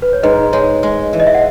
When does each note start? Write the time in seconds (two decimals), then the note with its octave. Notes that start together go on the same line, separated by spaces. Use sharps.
0.02 B4
0.13 C#5
0.23 G#2 B4 D#5
0.53 G#3 C#5
0.83 G#3
1.13 E3
1.20 D#5
1.27 E5
1.34 F#5